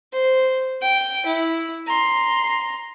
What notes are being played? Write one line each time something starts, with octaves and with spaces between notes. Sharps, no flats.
C5
G5
E4
A#5 C6